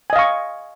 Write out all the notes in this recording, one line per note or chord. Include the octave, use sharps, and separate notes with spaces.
D#5 F5 G#5 C#6